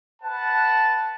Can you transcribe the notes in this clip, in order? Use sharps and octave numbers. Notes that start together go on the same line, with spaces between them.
B4 F#5 A5